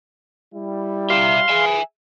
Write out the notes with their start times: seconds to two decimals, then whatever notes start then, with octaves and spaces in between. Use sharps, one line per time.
0.54 G3 E4
1.10 G4 E5 F5 C6
1.49 G#4 E5 G#5